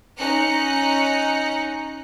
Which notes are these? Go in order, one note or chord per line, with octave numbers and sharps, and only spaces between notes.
C#4 D#4 A#5 F#6 C#7